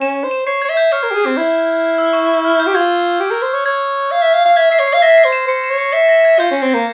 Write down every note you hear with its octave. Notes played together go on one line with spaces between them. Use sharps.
C#4 E7
C5
E7
C#5 C7
C#5 G#6
E5
G6
C#5 F6
A#4
G4
G#4
C4
E4
E6
C#6
E6
F6
G6
G4
F4 G#6
G4
A#4
C5
C#5
C#5 G#6
F5
E5
F5
F5
E5 G#6
E5 C7
C#5
C7
F5
E5 A#6
C7
C5
E7
C5 C#7
E7
C#5
C#7
E5 C7
A#6
G#6
F4 G6
C#4
C4
A#3